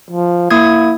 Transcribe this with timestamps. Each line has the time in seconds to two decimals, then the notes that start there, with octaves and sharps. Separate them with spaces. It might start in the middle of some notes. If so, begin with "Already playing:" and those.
0.11 F3
0.51 A#3 E4 D#6 G#6